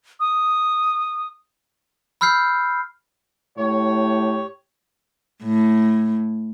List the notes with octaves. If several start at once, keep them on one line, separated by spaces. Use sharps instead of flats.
D#6
B5 E6 F6 G6 C7
A2 G4 C#5
A2